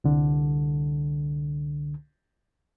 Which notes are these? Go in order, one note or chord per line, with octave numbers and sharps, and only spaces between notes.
C2 D3